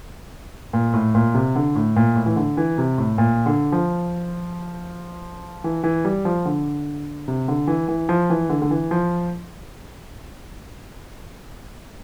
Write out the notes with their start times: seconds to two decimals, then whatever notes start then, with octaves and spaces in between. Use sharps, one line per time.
0.73 A#2
0.94 A2
1.15 A#2
1.34 C3
1.56 D3
1.75 A2
1.96 A#2
2.16 A2
2.26 E3
2.36 D3
2.57 E3
2.78 C3
2.98 A2
3.18 A#2
3.46 D3
3.72 F3
5.64 E3
5.84 E3
6.05 G3
6.25 F3
6.45 D3
7.28 C3
7.48 D3
7.67 E3
7.88 E3
8.09 F3
8.30 E3
8.50 D3
8.62 D3
8.71 E3
8.91 F3